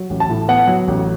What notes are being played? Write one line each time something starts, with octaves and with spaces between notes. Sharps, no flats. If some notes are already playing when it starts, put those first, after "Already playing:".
Already playing: F#3
A1
A5
A2
B3 F#5
F#3
A1